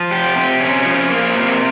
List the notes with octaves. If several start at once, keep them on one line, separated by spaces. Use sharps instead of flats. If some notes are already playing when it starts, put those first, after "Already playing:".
Already playing: F3
G4
C3
C#4
F3
A#3
C3